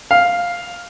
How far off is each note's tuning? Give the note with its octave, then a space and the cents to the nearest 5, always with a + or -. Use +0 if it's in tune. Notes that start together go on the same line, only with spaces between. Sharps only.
F5 +5